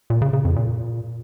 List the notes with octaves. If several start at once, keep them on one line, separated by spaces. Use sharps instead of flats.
A#2
C#3
C#3
F2
A#2